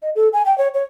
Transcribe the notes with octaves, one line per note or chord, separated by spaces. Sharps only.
D#5
A4
G#5
G5
C#5
C#5